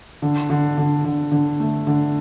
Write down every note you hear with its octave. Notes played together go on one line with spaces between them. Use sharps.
D3
D3
D3
D3
D3
A3
D3